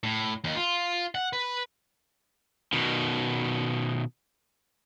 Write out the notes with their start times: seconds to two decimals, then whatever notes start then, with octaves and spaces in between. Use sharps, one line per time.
0.03 A2
0.44 D#2
0.56 F4
1.15 F#5
1.33 B4
2.73 B2 D#3